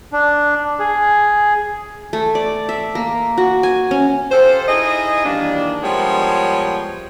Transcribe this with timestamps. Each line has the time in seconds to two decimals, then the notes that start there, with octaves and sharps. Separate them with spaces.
0.12 D4
0.79 G#4
2.13 A3
2.35 D5
2.69 E5
2.95 A#3
3.38 F#4
3.63 G#5
3.91 C#4
4.31 F4 G4 A4 C5
4.68 D#4 E4 G#4 D#5
5.25 D#3 E3 G3 A#3 D4
5.83 F3 G3 G#3 B3 A#4 C#5